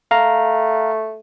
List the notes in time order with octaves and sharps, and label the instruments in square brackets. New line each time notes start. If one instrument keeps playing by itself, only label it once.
[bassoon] A3 [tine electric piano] F5 A#5